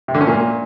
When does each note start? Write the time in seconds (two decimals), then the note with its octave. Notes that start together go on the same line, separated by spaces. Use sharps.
0.08 C3
0.14 D3
0.21 C#4
0.27 A#2